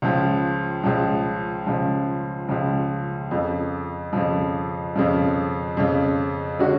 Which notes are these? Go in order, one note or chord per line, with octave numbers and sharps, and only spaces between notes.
C#2 C#3 F3
C#2 C#3 F3
C#2 C#3 F3
C#2 C#3 F3
F2 C#3 F3
F2 C#3 F3
F2 C#3 F3
F2 C#3 F3
D3 G#3 C#4 F#4